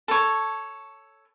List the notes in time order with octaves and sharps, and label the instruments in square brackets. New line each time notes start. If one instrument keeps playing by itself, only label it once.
[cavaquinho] A4 C#5